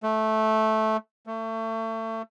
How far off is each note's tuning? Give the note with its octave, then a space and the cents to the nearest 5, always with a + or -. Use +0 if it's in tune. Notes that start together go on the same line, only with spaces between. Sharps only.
A3 -10
A3 +30